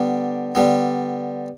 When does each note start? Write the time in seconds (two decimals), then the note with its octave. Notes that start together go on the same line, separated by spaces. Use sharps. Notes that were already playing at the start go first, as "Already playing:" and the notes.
Already playing: D3 G3 B3 D4
0.55 D3 G3 B3